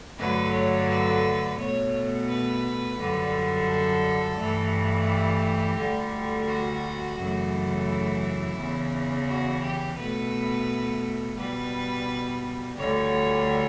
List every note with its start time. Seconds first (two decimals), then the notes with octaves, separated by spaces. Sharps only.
0.18 G2 D3 F#3 A3 B4
0.53 C#5
0.89 B4
1.59 B2 A3 C#5
2.28 B4
2.98 F#2 D3 G3
3.68 A4
4.38 G2 E3 A3
5.08 G4
5.78 D2 D3 G3
6.48 F#4
7.18 F#2 C#3 E3 A3
7.88 E4
8.57 E2 C#3 E3
9.27 F#4
9.63 G4
9.97 B2 A3 B4
11.37 B2 G3 B4
12.77 D2 D3 G3 C#5